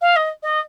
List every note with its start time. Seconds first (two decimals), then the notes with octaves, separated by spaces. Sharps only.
0.01 F5
0.16 D#5
0.43 D#5